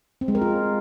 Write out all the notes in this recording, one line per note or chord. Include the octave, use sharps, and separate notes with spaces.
C4
G#3
A#4
F4